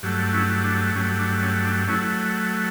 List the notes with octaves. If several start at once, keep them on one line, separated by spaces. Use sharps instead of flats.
G2 F#3 A3
C#4 E4
D4
G2 F#3 A3 C#4
D4
C#4
D4
F#3 A3 C#4 E4